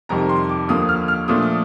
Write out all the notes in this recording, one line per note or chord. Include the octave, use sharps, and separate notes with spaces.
F2 C3 D#3 G3 A#5
C6
D6
D#2 D3 F3 A#3 D#6
F6
F6
A#2 F3 A3 D4 D#6
D#6